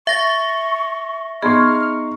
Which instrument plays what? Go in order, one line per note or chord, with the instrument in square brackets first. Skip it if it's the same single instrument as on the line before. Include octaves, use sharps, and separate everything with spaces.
[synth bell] E5 A#6 [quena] C#6
[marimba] B3 G#4 [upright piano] D#4 C6 C#6 [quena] F6